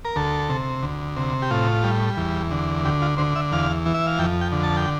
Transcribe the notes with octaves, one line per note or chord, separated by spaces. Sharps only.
A#4
D2 A4
C3
D2
C3
G4
A2 F4
G3
E2
D3
D2 G4
F4
D3 C5
E5
E2 F5
E3
E5
F5
F2 G5
G5
D3
A5
G5